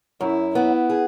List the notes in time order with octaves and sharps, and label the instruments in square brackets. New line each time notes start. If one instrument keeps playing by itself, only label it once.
[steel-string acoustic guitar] F#2 [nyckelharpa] E4
[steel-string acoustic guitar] B3 [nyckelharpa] E4
[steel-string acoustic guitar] G#4